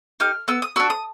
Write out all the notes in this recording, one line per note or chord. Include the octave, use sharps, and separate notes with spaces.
D#4 G4 F6
B3 E6
D#6
D4 F#4 E6
D#6